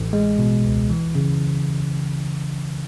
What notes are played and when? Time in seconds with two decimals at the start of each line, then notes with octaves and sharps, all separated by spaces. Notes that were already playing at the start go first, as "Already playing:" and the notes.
Already playing: A1
0.13 G#3
0.39 B2
0.64 C#2
0.90 E3
1.15 C#3